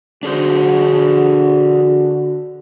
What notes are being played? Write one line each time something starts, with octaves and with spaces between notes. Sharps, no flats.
D3 D4 F#4 G#4 C5